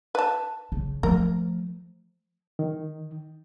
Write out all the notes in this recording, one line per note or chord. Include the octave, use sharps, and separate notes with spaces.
B4 A5
C#3
F3 A3 A#4
D#3